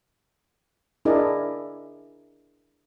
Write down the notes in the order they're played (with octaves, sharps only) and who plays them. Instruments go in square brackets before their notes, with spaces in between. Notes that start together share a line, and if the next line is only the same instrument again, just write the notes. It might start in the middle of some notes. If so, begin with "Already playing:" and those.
[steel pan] D4 E4 G#4 A#4 D5 D#5